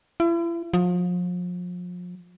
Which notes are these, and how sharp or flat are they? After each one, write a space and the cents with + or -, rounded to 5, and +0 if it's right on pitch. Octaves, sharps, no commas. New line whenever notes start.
E4 +40
F3 +35